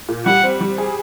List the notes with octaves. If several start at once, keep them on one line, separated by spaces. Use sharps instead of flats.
A#2
G3 F#5
C4
G3
G#4